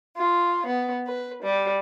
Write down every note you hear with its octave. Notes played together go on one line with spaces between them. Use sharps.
F4
B3
B4
G3